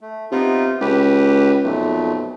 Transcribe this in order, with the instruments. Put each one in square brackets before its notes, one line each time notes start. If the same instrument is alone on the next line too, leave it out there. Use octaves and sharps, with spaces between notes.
[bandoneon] A3
[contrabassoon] C3 [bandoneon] B3 D#4 F4
[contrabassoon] C#2 [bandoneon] G4 B4
[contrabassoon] B1 [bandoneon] F2 A#2 A3